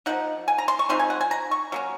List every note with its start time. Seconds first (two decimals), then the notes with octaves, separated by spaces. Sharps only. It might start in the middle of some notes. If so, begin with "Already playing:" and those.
0.06 F3 A#3 D#4 F#5
0.48 G#5
0.58 A#5
0.68 C6
0.79 C#6
0.89 F3 G#3 C4 D#4 C6
0.99 G#5
1.10 F#5
1.21 G#5
1.31 A#5
1.51 C#6
1.72 F#3 A#3 C#4